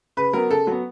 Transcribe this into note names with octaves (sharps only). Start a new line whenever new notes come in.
C#3 B4
F#3 B3 A#4
C#3 A4
F#3 B3